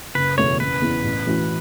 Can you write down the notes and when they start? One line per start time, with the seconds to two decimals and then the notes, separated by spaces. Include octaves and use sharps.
0.15 F#1 B4
0.37 E2 B2 A3 C#5
0.60 F#1 B4
0.81 E2 C#3 E3 B3
1.03 A1
1.26 A2 E3 C#4 F#4